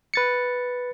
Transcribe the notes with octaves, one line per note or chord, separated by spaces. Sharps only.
B4 A6 C#7